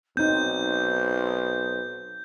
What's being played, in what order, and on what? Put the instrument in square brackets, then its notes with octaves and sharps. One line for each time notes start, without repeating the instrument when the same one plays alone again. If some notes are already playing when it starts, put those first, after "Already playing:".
[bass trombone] B1 [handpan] C4 D#4 [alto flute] C5 [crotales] G6